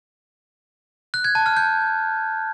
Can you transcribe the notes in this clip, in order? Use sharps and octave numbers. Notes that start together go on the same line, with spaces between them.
F#6
G#6
A5
F6
G6